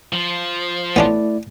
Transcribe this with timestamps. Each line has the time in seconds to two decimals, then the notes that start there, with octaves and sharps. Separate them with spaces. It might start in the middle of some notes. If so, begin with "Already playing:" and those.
0.13 F3
0.96 A3 B3 C#4 D4 E4 D5